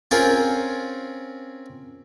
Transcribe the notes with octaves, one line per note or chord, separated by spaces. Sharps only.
C4 C#4 F4 G#4 A#4 C5